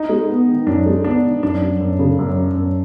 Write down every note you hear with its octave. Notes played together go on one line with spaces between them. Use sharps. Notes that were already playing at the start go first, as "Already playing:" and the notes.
Already playing: D#4
G#3
B3
D#3
F#2 D4
G#3
B3 D4
D#3
F#2 D4
F#3
F#2
C#3
F#2
F#3
F#2